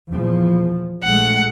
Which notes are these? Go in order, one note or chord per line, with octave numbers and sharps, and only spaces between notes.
E2 A#2 F3
A#1 G#3 A3 F#5